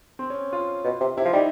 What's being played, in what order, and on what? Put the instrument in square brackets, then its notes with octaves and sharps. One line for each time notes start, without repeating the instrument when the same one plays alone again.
[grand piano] C4
C#4
F4
[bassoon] B2
C3
[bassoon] C3 [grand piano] E4
[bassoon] F3
[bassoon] G3 [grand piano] D#4